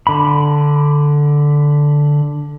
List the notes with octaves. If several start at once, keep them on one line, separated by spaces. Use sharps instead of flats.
D3 B5